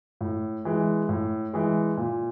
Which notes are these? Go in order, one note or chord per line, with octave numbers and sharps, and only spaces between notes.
A2
E3 G#3
A2
E3 G#3
A#2